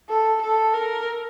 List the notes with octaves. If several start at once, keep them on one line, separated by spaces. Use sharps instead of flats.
A4
A4
A#4